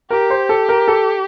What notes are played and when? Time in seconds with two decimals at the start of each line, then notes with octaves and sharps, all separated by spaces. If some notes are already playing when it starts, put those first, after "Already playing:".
0.10 G4 A#4
0.30 C5
0.49 A4
0.69 A#4
0.88 A4